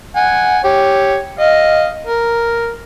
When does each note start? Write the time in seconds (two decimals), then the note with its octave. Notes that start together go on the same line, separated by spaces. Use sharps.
0.16 F#5 G#5
0.64 G4 C#5
1.39 D#5 F5
2.07 A#4